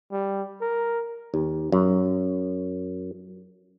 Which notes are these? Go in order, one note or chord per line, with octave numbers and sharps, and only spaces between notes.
G3
A#4
D#2
F#2